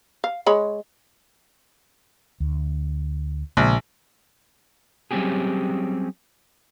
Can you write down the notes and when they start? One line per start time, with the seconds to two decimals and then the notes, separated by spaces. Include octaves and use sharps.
0.24 F5
0.46 G#3 C#5 B5
2.40 D2
3.57 A#1 C#3 G#3 A3
5.11 F#3 G3 C4 C#4 G4 G#4